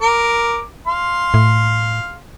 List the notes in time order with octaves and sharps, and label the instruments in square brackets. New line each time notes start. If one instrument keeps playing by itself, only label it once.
[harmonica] A#4 D6
F5 C6
[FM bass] A2